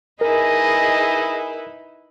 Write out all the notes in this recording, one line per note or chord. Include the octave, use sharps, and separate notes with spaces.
D#4 E4 G#4 A#4 B4 D#5